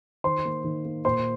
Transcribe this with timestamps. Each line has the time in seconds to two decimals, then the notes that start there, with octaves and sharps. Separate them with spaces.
0.24 D#3 C5 C6
0.45 A#3
0.64 D#3
0.85 A#3
1.05 A#2 C5 C6